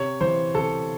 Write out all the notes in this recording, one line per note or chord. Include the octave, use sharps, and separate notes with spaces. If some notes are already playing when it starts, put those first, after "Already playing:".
Already playing: C3 C#5
E3 C5
C3 A4